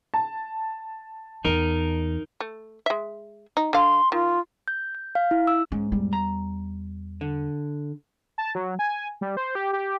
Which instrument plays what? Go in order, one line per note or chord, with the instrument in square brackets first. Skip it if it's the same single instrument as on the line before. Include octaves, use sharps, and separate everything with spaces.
[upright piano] A5
[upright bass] E2 [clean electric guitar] D#4 A#4
[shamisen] A3
G#3 E5
D#4
[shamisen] D3 F5 [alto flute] C6
[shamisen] D#3 [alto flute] F4
[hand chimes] G6
G6
F5
E4
E6
[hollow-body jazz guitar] G#2 [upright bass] C#4
[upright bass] E2 G3
[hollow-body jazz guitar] A#5
D3
[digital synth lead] A5
F#3
G#5
G3
C5
G4
G4